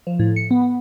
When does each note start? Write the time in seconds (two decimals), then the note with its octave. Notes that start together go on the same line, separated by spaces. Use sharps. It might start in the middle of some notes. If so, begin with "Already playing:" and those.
0.07 F3
0.19 A2
0.36 C#7
0.51 B3
0.62 B3